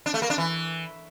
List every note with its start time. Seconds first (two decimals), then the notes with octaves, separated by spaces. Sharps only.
0.06 D4
0.14 A3
0.22 A#3
0.30 D4
0.38 E3